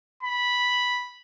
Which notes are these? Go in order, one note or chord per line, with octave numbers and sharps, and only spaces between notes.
B5